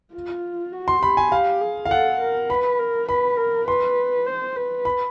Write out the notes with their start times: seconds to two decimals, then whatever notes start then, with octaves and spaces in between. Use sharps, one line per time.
0.14 F4
0.73 F#4
0.88 C6
1.02 G4 B5
1.17 G#5
1.32 G4 F5
1.61 G#4
1.85 F5
1.90 A4 F#5
2.20 A#4
2.50 B4 B5
2.79 A#4
3.09 B4 B5
3.38 A#4
3.68 B4 C6
4.27 C5
4.56 B4
4.85 B5